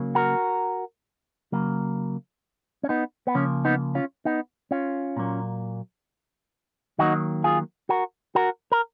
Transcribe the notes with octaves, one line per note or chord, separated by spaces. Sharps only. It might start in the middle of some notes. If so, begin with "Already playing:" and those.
Already playing: C#3 F#3 A#3
F#4 A#4
C#3 F#3 A#3
C#4
B3 D#4
B3
C#3 F3 A#3 C#4
B3 D#4
C#4 F4
B3 D#4
C#4 F4
A#2 F#3 A#3
D#3 F#3 A#3 D#4 F#4
F4 G#4
F#4 A#4
F#4 A#4
A#4